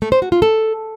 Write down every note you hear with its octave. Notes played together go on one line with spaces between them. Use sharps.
A3
C5
F#4
F4
A4